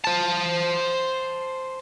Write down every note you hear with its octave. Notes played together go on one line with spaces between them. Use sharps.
C5 A5